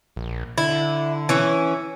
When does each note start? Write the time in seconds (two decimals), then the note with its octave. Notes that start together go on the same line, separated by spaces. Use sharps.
0.16 A#1
0.58 D3 E4
1.29 E3 C#4